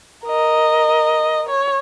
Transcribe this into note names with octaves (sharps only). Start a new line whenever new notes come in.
A#4 D#5
C#5